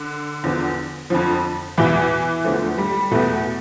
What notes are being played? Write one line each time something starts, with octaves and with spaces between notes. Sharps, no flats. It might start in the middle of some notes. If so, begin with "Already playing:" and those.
Already playing: D3
E2 D3 F3
F2 D3 F3
E2 B2 E3 E4
E2 D3 F3 A3
G3
E2 B2 A3